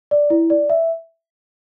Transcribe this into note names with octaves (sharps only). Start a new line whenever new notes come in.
D5
E4
D5
E5